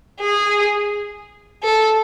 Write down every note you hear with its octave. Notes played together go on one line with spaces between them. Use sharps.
G#4
A4